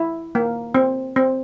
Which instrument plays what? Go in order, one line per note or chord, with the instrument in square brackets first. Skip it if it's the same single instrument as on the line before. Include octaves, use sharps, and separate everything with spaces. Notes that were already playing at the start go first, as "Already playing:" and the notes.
Already playing: [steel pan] E4
A#3
C4
C4